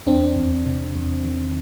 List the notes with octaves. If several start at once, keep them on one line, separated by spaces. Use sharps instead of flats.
E2 C4 D4
E2
C3
E2
D#3